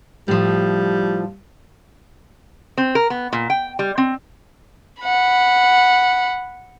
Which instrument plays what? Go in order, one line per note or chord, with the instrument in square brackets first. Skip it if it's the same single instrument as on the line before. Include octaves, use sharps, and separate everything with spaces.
[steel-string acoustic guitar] A2 F3 [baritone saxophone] G3
[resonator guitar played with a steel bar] C4
A#4
B3
A#2
G5
G3
C4
[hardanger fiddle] F#5 B5